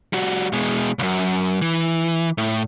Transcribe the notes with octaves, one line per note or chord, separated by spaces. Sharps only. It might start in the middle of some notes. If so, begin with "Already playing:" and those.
G3 F#4
B2 G#3
C#2 F#2
E3
A2